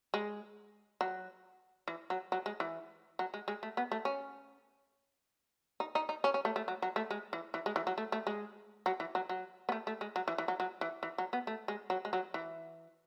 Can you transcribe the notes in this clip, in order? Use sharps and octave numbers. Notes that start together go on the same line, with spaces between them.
G#3
F#3
E3
F#3
F#3
G#3
E3
F#3
G#3
G#3
A3
B3
A3
C#4
D#4
D#4
D#4
C#4
C#4
A3
A3
F#3
F#3
A3
G#3
E3
E3
G#3
E3
F#3
A3
A3
G#3
F#3
E3
F#3
F#3
B3
A3
A3
G#3
F#3
E3
E3
F#3
F#3
E3
E3
F#3
B3
A3
G#3
F#3
G#3
F#3
E3